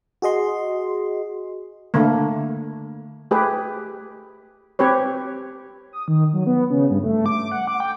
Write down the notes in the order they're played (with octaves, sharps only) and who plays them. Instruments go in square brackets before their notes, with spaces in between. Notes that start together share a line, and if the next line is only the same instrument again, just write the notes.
[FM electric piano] F#4 G#4 D#5 C6
[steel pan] D3 A3 A#3
A3 G4 G#4 B4
C4 G4 B4 C#5
[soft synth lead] D#6
D#3
F#3
B3
C#3
G2
A3
D6
F#5
D6
G5